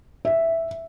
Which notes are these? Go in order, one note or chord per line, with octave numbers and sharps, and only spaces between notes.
E5